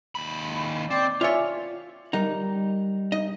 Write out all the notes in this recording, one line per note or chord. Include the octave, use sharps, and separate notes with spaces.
D#2 B5
C4 D5
F4 C#5 D5 E5 G#5
G3 D#4 A#4 F#5
D#4 D#5